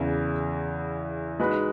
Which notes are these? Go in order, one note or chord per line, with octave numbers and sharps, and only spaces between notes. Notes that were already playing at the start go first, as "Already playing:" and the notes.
Already playing: E2 C#3 E3
G#3 D#4 F#4 B4